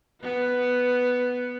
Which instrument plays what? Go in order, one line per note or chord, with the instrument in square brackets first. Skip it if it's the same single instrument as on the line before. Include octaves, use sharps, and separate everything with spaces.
[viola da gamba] B3 B4